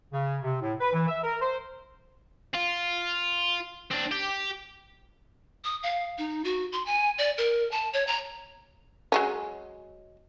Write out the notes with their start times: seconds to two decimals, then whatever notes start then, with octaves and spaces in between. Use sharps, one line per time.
0.12 C#3
0.42 C3
0.61 A2
0.80 B4
0.93 E3
1.07 E5
1.23 A#4
1.41 C5
2.54 F4
3.91 C4 D4
4.11 G4
5.64 D#6
5.83 F5
6.18 D#4
6.45 F#4
6.72 C6
6.86 G#5
7.18 D5
7.38 A#4
7.71 A5
7.93 C#5
8.07 A#5
9.12 F#3 G#3 C#4